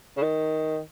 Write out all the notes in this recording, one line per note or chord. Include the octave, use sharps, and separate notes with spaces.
C#3
D#3